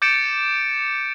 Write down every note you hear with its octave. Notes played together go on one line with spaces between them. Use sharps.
D6 G6 A6 C#7 D7 E7